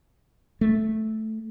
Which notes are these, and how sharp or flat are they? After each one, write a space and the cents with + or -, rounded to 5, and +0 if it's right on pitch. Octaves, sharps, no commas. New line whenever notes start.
A3 -5